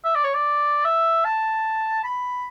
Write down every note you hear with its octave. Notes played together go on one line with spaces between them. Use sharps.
E5
D5
C#5
D5
E5
A5
B5